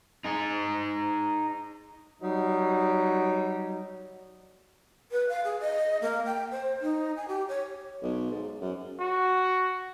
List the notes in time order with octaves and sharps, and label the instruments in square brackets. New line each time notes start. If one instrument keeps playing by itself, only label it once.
[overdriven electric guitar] D#4 G#4
[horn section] F#3 G3 D#4
[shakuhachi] B4
F5
G#4
D#5
A#3
G5
C5
D#4
G#5
G4
C#5
[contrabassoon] B1
G#2
F#2
[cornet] F#4